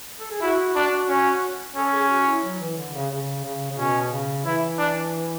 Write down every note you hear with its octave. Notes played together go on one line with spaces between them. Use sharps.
A4
G#4
E4 F#4
D4
C#4
C#4 A4
G#4
F#4
E4
F#3
E3
D3
C#3
C#3
C#3
C#3
B2 C#4
C#3
E3 E4
D4